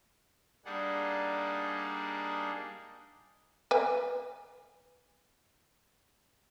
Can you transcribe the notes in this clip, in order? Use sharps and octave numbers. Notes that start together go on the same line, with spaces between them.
G3 A#3 D4 D#4 G#4 F#5
B4 G#5